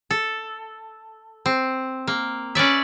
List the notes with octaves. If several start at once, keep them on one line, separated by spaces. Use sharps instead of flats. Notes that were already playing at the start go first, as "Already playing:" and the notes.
A4
C4
A#3
C#4 B4 D5 E5